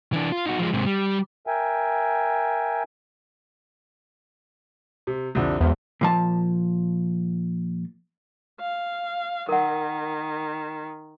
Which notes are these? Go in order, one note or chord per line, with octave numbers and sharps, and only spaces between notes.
E3 D4
F4
D#4 F#4
F3 G#3
G#2 C3
G3
A#4 E5 G5 G#5
C3
C2 F2 D3
B1 E2 G#2 C5
A#2 F3 A5
F5
D#3 A#4 F#5